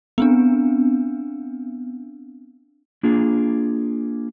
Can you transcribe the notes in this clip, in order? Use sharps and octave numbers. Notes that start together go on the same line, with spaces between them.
B3 C4 D4
A#3 D4 F4 G#4